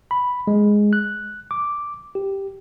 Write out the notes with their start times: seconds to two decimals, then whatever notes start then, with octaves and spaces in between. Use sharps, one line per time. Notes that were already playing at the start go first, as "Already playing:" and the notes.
0.11 B5
0.47 G#3
0.93 F#6
1.51 D6
2.15 G4